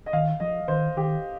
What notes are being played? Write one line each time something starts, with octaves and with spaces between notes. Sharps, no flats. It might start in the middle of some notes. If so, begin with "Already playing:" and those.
D#5
D#3 F5
F3 D#5
D#3 C5
D#3 G4